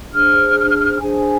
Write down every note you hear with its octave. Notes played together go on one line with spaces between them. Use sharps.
D4 G#4 C5 F6
D4 G#4 C5 G#5